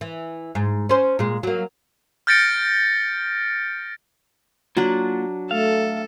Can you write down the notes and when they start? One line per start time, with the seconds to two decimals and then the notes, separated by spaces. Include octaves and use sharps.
0.01 E3
0.55 G#2
0.89 C#4 C5
1.19 A#2 G#3
1.43 F#3 A#3
2.27 F6 G6 A6 A#6 C#7 D7
4.77 F#3 A#3 D4 F4 F#5
5.51 A3 A4 F5